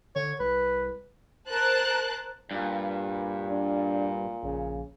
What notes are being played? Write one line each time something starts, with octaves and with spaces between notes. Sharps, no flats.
D3 C#5
C2 B4
A#4 C5 A5 F#6
G2 A#2
D4
A#1 C#3